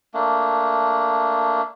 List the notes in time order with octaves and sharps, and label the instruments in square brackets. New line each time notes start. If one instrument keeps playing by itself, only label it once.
[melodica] A3 A#3 D4